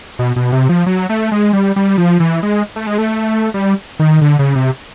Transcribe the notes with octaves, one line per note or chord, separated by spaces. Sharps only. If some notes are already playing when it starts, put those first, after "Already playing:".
B2
B2
C3
F3
F#3
A3
G#3
G3
G3
F3
E3
G#3
A3
G#3
A3
G3
D#3
D3
C#3
C3